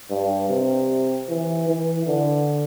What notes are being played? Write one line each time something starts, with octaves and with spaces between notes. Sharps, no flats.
G2
C3
E3
E3
D3